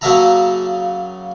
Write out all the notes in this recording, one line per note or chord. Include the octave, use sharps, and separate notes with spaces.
C#3 F#3 A#3 E5 A5 A#5